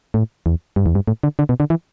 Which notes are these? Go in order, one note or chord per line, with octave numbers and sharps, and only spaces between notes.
A2
E2
G2
E2
G2
A2
D3
D3
B2
D3
E3